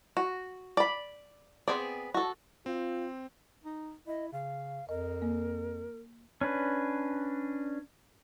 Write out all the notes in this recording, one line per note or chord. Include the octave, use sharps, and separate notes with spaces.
F#4
D5 B5
B3 C4 G#4 D5
F#4 A4
C4 F4
D#4
E4 D#5
C#3 F5
F2 A#4 D#5
A#3
C#4 D4 B4